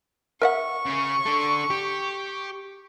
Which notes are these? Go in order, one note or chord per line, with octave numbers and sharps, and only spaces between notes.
A#4 E5 F#5 C#6
C#3 C#4
D4 A4
G4